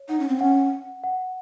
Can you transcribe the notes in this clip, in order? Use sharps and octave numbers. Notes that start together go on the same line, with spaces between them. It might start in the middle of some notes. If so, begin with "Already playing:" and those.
Already playing: C#5
D#4 F#5
C#4
C4
C#4 F#5
F#5
F#5